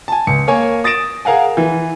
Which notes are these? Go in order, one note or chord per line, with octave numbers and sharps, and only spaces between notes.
G#5 A5
C#2 C#7
A#3 C#5 G#5
D#6 A6 A#6 D7 E7
G#4 A#4 F5 F#5 G#5
E3